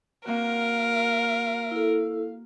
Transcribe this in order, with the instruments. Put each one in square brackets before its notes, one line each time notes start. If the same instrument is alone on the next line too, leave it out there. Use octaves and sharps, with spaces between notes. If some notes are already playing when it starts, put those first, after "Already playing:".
[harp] A#3 C4 F#4 [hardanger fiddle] A#4 [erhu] F5
[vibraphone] E4 A4